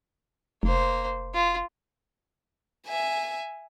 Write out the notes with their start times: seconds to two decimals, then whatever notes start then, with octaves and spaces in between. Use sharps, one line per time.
0.63 F1 A#3 C5
1.34 F4
2.87 E5 G#5